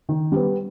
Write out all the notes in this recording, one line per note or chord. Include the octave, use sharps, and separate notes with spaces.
D#3
G3 B3